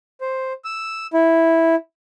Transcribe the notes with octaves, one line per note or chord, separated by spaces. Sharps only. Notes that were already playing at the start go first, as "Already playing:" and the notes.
C5
E6
E4